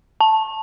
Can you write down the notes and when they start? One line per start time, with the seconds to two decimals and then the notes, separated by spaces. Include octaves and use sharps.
0.21 A5